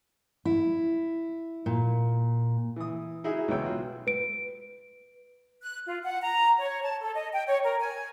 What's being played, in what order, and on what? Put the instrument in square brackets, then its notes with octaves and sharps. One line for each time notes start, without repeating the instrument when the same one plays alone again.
[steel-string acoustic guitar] E4
A#2
[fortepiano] E3 D#6
D#4 E4 F#4 G#4 E5
B1 E2 B2 C#5 G5 E6
F4 F#4
[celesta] B4 D7
[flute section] F#6
F4
F#5
A#5
C#5
A5
A4
D#5
G5
C#5
A#4
G#5